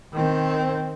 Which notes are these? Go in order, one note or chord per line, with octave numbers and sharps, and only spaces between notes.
D#3 C4